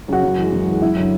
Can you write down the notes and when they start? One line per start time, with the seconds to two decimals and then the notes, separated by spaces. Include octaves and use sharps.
0.08 C#3 F#3 F#4
0.23 F#2
0.38 E3 G#3
0.52 F#2
0.67 E3 G#3
0.82 F#2 E4
0.97 D3 F#3